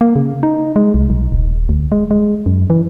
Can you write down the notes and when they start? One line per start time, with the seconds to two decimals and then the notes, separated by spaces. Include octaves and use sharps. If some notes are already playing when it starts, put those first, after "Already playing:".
0.01 A#3
0.16 C#3
0.43 D#4
0.76 G#3
0.94 C2
1.10 B1
1.32 D#1
1.69 D2
1.92 G#3
2.11 G#3
2.46 F#2
2.70 E3